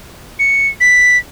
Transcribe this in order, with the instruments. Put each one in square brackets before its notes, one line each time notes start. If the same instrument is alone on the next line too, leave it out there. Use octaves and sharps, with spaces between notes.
[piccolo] C#7
B6